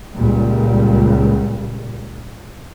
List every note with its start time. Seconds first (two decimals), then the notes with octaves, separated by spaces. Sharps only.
0.16 C#2 A#2 G3